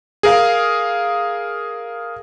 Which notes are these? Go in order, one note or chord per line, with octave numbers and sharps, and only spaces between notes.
G#4 A#4 F5